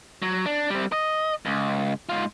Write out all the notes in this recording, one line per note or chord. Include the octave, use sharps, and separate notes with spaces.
F#3
D4
G3 C4
D#5
C#2
G#2 F4